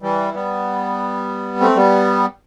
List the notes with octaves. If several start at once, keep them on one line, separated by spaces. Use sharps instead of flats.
E3 G3
G3 B3
A3 C4
G3 B3